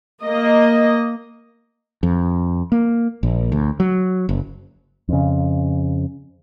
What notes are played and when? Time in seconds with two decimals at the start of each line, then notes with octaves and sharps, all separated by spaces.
0.24 A#3 D#5
2.03 F2
2.72 A#3
3.23 A#1
3.52 D2
3.80 F#3
4.29 F#1
5.09 F2 C#3